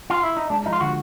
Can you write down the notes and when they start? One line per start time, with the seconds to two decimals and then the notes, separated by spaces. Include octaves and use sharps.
0.10 F4
0.23 E4
0.37 D#4
0.50 G#3 D4
0.65 F3 D#4
0.73 F4
0.80 D3 F#4